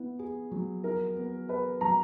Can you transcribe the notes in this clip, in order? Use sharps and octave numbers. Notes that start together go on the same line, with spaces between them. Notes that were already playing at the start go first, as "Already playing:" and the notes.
Already playing: B3 E4
G#4
F#3
E4 A#4
B3
G#4 B4
F#3 A#5